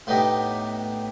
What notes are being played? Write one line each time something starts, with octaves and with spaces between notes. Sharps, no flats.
A2 B3 D4 D#4 G4 D#5